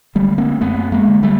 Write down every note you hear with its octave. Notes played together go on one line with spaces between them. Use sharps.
D3 G3 A3
A#3 C4
F#2 A3 B3
G#3 A#3
D3
G3 A3